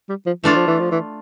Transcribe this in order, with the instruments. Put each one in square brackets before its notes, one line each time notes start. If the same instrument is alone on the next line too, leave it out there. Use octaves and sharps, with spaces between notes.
[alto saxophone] G3
F3
[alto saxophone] E3 [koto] A3 D4 F4 A4
[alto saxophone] F3
E3
F3
E3